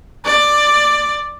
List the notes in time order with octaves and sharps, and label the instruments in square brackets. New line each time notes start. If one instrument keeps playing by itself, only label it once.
[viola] D5